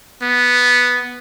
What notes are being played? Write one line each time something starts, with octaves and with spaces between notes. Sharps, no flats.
B3